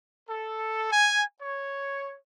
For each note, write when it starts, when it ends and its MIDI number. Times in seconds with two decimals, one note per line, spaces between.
0.29 0.90 69
0.91 1.23 80
1.41 2.17 73